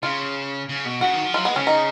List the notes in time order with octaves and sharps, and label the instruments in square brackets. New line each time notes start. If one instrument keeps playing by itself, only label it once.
[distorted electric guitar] C#3 [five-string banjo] F4
[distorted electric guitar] C#3
B2
[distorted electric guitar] C#3 [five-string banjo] F#4
[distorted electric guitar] D#3
F3
[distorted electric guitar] F#3 [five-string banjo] F4
[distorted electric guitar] G#3 [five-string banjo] B3
[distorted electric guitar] C#3 [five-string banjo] C#4
[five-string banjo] D#4